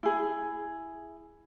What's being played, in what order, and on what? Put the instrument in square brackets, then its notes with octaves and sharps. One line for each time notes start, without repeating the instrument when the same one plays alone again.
[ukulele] E4 G#4